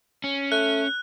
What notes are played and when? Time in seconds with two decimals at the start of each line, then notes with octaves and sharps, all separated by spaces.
0.24 C#4
0.52 A3 F#6